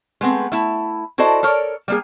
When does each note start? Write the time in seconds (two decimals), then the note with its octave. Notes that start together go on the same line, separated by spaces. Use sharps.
0.21 G#3 A3 B3 C4
0.52 A3 E4
1.18 E4 F#4 A4 C5 D5 D#5
1.43 A4 A#4 C#5 D5
1.88 G3 A#3 G#4